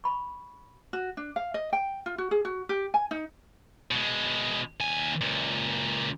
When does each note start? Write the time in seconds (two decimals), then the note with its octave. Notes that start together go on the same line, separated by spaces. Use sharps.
0.04 B5 C#6
0.93 F#4
1.17 D4
1.36 F5
1.54 D#5
1.73 G5
2.06 F4
2.18 F#4
2.31 G#4
2.45 F#4
2.69 G4
2.94 G#5
3.11 D#4
3.91 B2 G#3
4.80 D#2 G#5
5.21 C#2 A#2